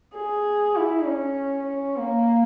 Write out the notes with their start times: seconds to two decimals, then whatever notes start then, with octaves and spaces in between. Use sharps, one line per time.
0.15 G#4
0.76 E4
1.07 C#4
1.67 C#4
1.97 A#3